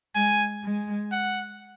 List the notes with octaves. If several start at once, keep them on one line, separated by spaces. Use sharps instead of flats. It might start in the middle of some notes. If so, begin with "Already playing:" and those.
G#3 G#5
G#3
F#5